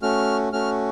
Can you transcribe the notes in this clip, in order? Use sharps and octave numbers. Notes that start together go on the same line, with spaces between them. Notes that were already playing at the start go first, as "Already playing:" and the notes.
A3 C#4 F#4 F6
A3 C#4 F#4 F6